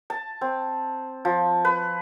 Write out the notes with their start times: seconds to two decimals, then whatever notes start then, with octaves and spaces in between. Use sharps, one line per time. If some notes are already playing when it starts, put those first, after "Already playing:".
0.10 A5
0.41 C4
1.25 F3
1.65 B4